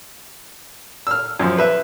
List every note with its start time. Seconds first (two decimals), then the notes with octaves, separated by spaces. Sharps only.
1.07 E6 F6
1.40 F#2 F3
1.58 B4 E5